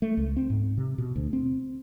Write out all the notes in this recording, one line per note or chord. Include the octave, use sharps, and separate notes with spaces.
A3
C#2
C4
G#2
C3
B2
D2
C4